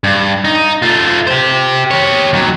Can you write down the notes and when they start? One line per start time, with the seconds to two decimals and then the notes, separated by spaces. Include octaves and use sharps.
0.04 G2
0.45 D#4
0.82 A3 F4
1.27 G4 C5
1.91 G4 C#5
2.33 D#2 F#3